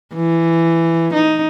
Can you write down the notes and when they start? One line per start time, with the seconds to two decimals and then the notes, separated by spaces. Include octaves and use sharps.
0.15 E3
1.13 D#4